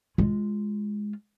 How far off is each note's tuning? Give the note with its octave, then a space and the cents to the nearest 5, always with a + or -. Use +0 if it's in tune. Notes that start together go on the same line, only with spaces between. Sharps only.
G#3 +0 F4 +0